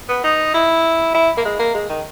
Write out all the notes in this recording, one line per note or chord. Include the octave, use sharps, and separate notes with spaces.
B3
D#4
E4
E4
A#3
G#3
A#3
G#3
D#3